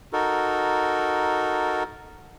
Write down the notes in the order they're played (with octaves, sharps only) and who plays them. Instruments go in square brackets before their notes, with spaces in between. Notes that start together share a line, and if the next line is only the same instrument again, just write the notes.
[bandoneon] D#4 F#4 A4 A#4